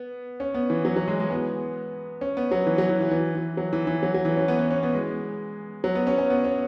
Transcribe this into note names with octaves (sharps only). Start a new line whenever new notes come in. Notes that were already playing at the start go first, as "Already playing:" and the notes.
Already playing: B3
C#4
B3
E3
F#3
F#3
G#3
G#3
B3
C#4
B3
F#3
E3
F#3
E3
E3
E3
E3
F#3
E3
E3
F#3
F#3
E3
C#4
B3
B3
C#4
B3
G#3
F#3
B3
C#4
C#4
B3
C#4